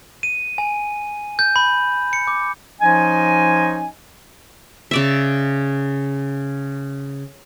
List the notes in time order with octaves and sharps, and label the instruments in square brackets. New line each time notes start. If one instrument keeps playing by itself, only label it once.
[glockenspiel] D#7
G#5
G6
B5
C#7
D6
[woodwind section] F3 C#4 D#4 D#5 G#5
[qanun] C#3 D5 E5